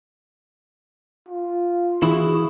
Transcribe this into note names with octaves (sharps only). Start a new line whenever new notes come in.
F4
E3 E4 F#4 G#4